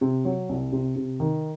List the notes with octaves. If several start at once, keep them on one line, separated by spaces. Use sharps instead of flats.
C3
F#3
C2
C3
C3
D#3